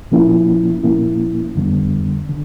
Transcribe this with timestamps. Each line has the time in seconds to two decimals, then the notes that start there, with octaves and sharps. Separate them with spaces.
0.11 A#2 F3 A#3 C#4 E4
0.83 A#2 F3 A#3 C#4 E4
1.55 F2 D3 G3 B3
2.29 D3